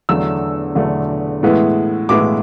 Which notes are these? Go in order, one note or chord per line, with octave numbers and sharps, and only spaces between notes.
E2 D3 F#3 A3 E6
E2 D3 F#3 A3
A2 E3 G#3 B3 E4
A2 E3 G#3 B3 E4 D6